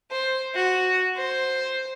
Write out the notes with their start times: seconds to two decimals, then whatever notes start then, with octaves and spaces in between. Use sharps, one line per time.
0.11 C5
0.55 F#4
1.17 C5